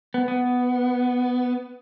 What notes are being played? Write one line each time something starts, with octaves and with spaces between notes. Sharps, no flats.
B3
B3